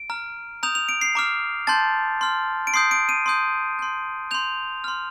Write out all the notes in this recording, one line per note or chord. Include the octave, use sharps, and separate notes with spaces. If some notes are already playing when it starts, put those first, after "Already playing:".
Already playing: D7
A#5 F6
A#5 D#6 G6 F7
F7
D7
C7
A#5 D6 F6
A5 C6 G6 A6
C6 F6
D7
C6 D#6 G6 C7
D7
D#7
C6 D#6 G6
C6 G6
C6 G6 F7
C6 F6